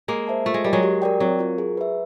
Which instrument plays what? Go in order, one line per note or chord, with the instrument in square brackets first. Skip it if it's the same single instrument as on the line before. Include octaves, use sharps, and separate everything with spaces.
[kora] G#3 A#3 [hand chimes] G#4
[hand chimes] C5 E5 A5
[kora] A3 [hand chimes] F4
[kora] G#3
[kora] G3 [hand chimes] A#4 D#5 G#5
[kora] F#3 G#3
[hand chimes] G4
A#4 D5 G5
[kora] F#3 [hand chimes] C4
[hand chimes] F4 A#4
G#4
B4 E5